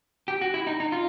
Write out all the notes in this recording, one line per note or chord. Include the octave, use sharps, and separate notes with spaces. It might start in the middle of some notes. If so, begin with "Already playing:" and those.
G4
F#4
E4
D#4
D#4
F4